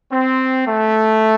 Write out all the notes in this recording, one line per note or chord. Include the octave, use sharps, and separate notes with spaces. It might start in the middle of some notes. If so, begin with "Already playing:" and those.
C4
A3